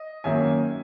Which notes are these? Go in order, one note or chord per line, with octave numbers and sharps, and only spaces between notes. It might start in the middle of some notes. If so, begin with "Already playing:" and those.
Already playing: D#5
F#2 D#3 F#3 A#3 E5 G#5